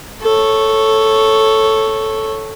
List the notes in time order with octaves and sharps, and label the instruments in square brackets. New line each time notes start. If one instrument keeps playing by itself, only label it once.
[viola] A4 C#5